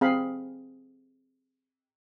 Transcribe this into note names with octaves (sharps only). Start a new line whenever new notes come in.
C4 G#4 F5 B5